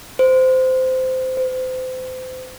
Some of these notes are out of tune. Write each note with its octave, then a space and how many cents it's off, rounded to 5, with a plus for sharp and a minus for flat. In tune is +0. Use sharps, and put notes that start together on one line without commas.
C5 -20
C5 -35